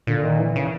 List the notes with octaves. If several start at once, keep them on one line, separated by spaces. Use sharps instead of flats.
A#2 D3
D#3
E3
C#3